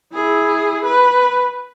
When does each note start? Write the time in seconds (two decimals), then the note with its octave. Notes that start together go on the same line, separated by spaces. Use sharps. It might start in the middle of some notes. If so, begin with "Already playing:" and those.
0.14 E4 G#4
0.85 B4